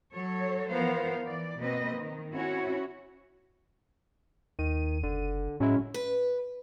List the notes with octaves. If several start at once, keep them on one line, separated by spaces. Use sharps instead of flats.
F#3 A4 C#5
E3 F3 B3 A#4 C5 F5
E3 D5
B2 A#3 C4 B4 D#5
D#3
C4 C#4 E4 F#4 C#5
D#2 D#3 D#7
F#1 D3
A2 F#3 G#3 C#4 E4
B4